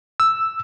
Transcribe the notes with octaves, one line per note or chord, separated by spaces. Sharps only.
E6